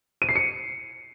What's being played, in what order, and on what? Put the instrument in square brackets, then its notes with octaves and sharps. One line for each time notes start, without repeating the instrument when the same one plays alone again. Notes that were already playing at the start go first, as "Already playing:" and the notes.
[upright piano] D#7
C7
C#7